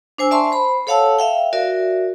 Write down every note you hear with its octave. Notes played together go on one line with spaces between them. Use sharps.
D4 C5 G#5 E6
D5 E5 A5 C6 C#6
C5 B5
A4 C#5 F5 F#5 A5 E6
E5 F5 G5
F#4 A#4 D5 E5